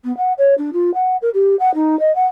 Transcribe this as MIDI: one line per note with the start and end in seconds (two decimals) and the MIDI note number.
0.04 0.15 59
0.17 0.32 78
0.38 0.54 73
0.58 0.70 62
0.73 0.91 65
0.94 1.16 78
1.22 1.29 70
1.34 1.55 67
1.59 1.73 78
1.74 1.98 63
1.99 2.13 75
2.15 2.25 78